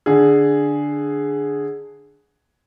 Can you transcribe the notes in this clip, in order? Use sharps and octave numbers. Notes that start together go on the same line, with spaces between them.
D3 G#4